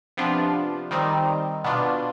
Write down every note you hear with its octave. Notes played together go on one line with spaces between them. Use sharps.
C3 F3 B3 D4 F4
D#3 G3 C4 D#4
B2 B3 D4 F4